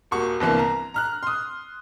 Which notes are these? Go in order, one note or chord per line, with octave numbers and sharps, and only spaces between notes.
D#1 A#3 F#4 C#6
G1 C2 E3 A#3
A#5
A#5 F6 F#6
C6 D#6